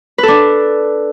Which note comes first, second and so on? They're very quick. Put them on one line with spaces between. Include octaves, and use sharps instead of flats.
B4 A4 D4